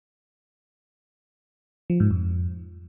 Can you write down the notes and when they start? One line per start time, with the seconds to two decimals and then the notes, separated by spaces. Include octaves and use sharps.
1.90 F3
2.00 G#2
2.11 F2